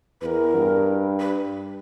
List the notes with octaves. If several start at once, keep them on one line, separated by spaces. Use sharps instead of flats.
E2 A#4 B4
G2
B4